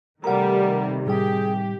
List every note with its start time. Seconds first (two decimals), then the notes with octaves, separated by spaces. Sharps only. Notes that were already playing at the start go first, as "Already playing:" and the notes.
0.24 C3 D#3 G3 A3 A#4 F#5 A#5
1.06 A2 G3 G4 G#4 G5